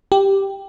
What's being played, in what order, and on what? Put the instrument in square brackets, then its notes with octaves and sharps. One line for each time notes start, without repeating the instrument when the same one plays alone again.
[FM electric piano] G4